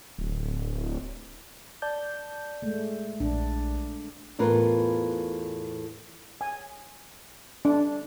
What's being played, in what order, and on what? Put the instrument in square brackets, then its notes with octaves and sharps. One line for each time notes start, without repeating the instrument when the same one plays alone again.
[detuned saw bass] D1
[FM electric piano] D5 A5 G6
[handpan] G#3 A3
[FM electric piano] A#1 [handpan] D4
[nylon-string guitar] E2 A2 F4 A#4 B4
[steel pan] G#5
D4